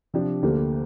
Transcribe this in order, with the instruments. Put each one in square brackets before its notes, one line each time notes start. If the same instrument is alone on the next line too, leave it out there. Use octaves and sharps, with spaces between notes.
[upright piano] C3 F3 D4 G4
D2 D3 A#3 G4